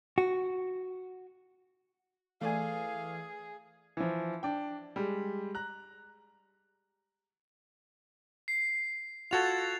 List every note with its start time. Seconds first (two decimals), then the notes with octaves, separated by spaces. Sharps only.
0.18 F#4
2.41 E3 A3 G#4 D5 F5 G#5
3.97 E3 F3
4.43 D4 G5
4.96 G3 G#3
5.55 A#5 F#6
8.48 C7
9.31 F4 F#4 A4 G#6 A6 F7